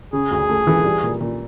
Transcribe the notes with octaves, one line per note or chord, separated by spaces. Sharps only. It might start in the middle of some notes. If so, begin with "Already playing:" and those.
C#3 G#4
D2
A3
E3
G3
A#2
A#2